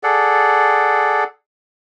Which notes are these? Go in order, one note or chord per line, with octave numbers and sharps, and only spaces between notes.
G#4 A4 D5 F#5